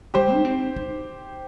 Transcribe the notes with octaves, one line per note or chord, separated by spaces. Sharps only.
G3 G4 C5
D#4
C4
D#4